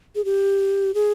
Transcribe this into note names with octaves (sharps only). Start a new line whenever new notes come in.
G#4
G4
G#4